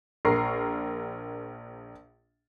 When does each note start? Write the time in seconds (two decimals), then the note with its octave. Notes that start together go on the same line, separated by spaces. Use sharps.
0.25 A#1 A#4 A#5 C#6 C7